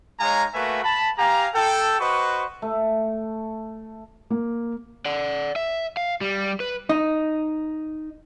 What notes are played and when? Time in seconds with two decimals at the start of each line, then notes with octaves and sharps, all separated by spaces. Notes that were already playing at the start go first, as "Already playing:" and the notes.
0.20 G#3 D#4 C#5 F5 G#5 A#5
0.54 A3 A#3 F#4 B4 E5 G#5
0.84 A5 B5
1.18 G4 F5 G#5 A#5
1.54 A4 G5
2.00 F#4 B4 C5 D#5 C#6
2.62 A3
4.30 A#3
5.06 D5 F#5
5.56 E5
5.97 F5
6.21 G3
6.60 B4
6.89 D#4